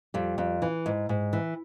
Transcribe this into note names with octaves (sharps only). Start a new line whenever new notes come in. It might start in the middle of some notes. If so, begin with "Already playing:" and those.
F2 G3
F2
E3
G#2
G#2
E3